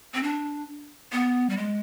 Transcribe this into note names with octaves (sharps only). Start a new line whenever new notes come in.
C4
D4
B3
G3
G#3